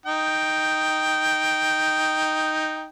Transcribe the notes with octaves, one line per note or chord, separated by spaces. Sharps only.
D#4 G5